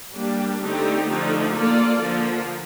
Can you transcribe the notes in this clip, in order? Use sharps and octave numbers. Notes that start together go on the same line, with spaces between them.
G3 A#3 D4 G4
D3 A3 C4 D#4 G4
D3 F3 A3 D#4
A#3 F4 A4 D5
D3 F3 A#3